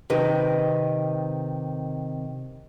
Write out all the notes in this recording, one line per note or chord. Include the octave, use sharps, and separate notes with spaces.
C3 D#3 B4 D#5